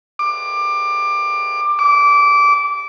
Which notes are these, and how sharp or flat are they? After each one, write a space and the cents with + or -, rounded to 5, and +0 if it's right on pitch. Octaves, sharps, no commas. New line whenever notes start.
D6 +20
D6 -20